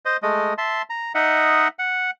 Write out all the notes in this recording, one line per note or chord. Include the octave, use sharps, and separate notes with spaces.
C5 D#5
G#3 A3 D#5
E5 A5 C6
A#5
D#4 D#5 E5 F#5
F#5